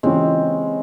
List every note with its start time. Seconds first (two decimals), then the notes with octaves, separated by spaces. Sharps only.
0.03 C#3 E3 G#3 A#3 C4 C#4 F4